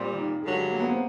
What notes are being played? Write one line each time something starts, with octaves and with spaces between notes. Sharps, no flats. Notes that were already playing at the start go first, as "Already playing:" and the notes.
Already playing: A#2 G3 C4
D#3
G2 D3 F#3 G#3
A#3
B3
C4